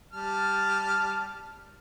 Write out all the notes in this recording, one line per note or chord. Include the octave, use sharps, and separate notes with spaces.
G3 A5 F6